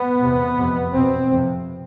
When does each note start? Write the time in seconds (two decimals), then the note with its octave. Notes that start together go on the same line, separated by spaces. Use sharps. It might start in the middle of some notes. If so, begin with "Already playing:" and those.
Already playing: B3
0.22 E2 C3
0.59 F2 C3
0.94 E2 B2 C4
1.31 F2 C3